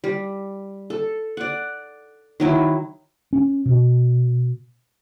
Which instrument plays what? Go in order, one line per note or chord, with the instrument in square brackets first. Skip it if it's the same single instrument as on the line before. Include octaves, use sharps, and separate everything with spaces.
[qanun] G3
A4
D5 F#5
D#3 F#3 E4
[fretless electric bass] C#4
B2